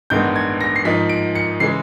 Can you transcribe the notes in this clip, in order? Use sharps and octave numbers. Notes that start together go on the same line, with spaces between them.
A1 G2 D#3 G#3 B3 G6
G#6
A#6
C7
G#2 F3 A#3 D#4 B6
D7
C#7
C#3 E3 G#3 C7